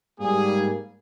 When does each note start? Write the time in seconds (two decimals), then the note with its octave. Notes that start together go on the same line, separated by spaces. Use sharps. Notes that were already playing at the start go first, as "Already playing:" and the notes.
0.19 G#2 G3 A#3 G#4